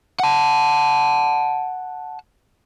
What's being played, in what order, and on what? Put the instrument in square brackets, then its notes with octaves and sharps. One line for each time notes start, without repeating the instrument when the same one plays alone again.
[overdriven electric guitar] F#5 A5